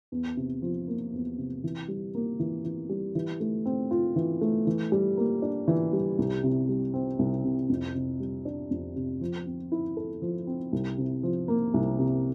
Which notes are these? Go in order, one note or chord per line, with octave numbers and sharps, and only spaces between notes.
E2
C3
F3
A#3
E2
C3
E3
G3
A#3
E3
E3
G3
E3
A3
C4
F4
E3
A3
E3
G3
A#3
D4
E3
G3
C2
C3
G3
C4
C2
C3
F2
C3
G3
D4
F2
C3
F3
C4
E4
A4
F3
C4
C2
C3
F3
A#3
C2
C3